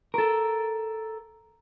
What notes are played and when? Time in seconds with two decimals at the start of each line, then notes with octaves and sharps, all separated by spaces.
0.14 A4 A#4